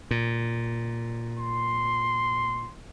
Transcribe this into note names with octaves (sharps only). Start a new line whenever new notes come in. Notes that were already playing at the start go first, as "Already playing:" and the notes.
A#2
C6